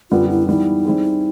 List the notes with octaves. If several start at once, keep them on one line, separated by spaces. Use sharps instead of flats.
F#2 D3 G3 B3 F4
E4
E3 G3 B3 D#4 E4
G3 C4 E4 G#4